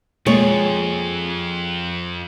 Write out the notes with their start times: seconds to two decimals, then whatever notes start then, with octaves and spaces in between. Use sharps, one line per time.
0.26 F2 B2 G#3 A#3 F4 G#4 C#5